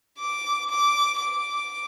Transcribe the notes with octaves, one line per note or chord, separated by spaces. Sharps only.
D6
D6
D6